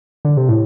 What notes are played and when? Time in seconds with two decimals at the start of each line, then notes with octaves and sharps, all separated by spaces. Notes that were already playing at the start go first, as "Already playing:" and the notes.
0.25 D3
0.37 C3
0.49 A2